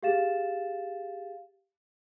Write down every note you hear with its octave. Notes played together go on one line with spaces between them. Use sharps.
G4 G#4 F5 A6 E7